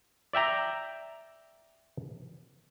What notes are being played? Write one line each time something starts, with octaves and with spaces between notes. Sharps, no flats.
D5 E5 G5 A#5